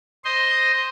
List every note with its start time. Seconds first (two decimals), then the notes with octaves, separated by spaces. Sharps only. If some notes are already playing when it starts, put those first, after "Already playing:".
0.25 C5 D#5 C6